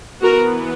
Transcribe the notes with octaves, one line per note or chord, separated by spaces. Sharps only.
E3 B3 F#4 A#4